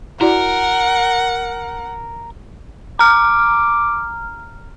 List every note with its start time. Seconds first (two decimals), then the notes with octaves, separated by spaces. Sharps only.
0.21 E4 F#4 A#4 D5 F#5
2.99 A#5 D6 F6